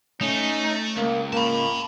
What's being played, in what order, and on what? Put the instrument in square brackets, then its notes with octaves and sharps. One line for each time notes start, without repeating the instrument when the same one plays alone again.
[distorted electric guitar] A3 [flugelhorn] C#4 [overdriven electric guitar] D#4
[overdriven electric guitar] C#2 [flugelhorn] A#3
[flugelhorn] A#3 [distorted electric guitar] A5 B5